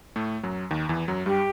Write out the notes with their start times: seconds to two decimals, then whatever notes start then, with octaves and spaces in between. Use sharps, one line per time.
0.16 A2 A3
0.43 F#2 F#3
0.71 D#2 D#3
0.89 E2 E3
1.08 F#2 F#3
1.26 G2 G3 G4